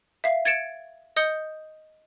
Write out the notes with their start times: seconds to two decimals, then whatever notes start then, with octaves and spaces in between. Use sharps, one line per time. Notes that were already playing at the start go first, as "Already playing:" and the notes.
0.24 E5 F5
0.45 G#6 A6 C#7 D7 E7
1.16 D#5 D#6 G6 C#7 G7